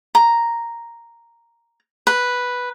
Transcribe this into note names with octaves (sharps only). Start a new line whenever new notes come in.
A#5
B4